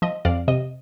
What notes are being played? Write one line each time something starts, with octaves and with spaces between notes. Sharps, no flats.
F3 D#5
F2 D5 F5
C3 D#5